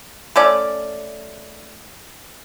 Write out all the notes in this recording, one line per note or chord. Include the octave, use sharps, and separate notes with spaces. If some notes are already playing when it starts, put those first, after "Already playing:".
A3 C#4 D5